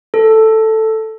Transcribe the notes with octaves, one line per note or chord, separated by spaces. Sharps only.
A4